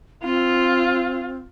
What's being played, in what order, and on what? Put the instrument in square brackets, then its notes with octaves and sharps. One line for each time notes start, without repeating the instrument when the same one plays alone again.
[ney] C4 [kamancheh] F4